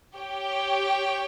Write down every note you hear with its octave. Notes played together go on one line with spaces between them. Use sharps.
G4 C#5 G5